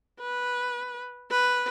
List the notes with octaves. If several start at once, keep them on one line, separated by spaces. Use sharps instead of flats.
B4
B4